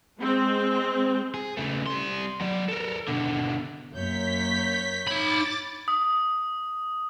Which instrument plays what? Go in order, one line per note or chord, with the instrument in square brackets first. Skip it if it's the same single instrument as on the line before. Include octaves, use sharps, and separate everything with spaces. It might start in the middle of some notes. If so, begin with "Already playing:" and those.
[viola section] G#3 C4
[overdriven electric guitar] G#4
C#3 A3
G3 C6
F#3 D5
A4 A#4
B2 D3
[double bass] F#2 A#3 [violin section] C#5 G6 [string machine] B6
[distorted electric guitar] D#4 B5 [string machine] D6 A6
[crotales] D#6